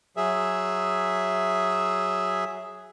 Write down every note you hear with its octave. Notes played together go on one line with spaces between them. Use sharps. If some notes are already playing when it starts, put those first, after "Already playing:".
F#3 G#4 E5